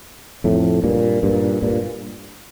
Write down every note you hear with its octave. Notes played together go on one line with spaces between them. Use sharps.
F2 A2
G2 A#2
G2 A#2
G2 A#2